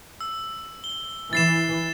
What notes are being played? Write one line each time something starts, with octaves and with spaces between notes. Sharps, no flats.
E6
G7
E3 A6 C7 E7